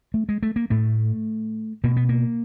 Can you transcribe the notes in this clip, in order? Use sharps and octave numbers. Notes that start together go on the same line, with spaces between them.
A3
G#3
A3
A#3
A2 A3
B2 A#3
B3
A#3